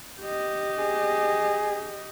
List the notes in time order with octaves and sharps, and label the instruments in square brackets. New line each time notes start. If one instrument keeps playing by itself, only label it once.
[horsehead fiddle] G4 D#5
[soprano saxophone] G#4